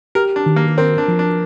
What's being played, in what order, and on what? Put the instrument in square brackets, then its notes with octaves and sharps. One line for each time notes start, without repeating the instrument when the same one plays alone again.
[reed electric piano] G4 [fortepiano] A#4
[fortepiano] D4
[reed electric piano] D#3
[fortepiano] A#3
[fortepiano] C4 [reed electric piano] A#4
[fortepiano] D4
[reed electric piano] F3
[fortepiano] D4